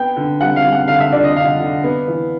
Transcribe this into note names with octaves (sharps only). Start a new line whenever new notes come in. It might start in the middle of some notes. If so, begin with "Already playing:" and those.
Already playing: B3 G5
D3
G3 F#5
F5
G3
F#5
D3 F5
E5
D3 D5
D#5
D3 F5
D3
B3
E3